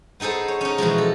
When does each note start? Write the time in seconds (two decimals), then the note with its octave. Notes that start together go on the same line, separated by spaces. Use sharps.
0.20 B3 D#4 G#4 A4 C5
0.48 C#5
0.61 C#4 D#4
0.78 B2 E3 F3 G#3
0.98 A4